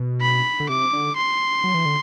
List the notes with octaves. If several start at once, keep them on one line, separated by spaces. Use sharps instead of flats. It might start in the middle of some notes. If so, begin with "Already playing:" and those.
Already playing: B2
B5
D3
C3 D6
D3
C6
F#3
E3
D3